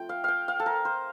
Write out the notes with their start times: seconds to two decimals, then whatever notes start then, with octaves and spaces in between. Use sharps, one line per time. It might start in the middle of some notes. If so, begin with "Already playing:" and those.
Already playing: F3 A3 C4 G5
0.09 F5
0.24 F5 G5
0.48 F5
0.60 A4
0.66 A#4
0.85 C5